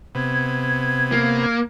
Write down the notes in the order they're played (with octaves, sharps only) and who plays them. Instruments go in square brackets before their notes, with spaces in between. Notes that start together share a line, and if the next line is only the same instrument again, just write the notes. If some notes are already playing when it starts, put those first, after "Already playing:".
[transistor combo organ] C3 B3 [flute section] G#6
[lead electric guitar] A#3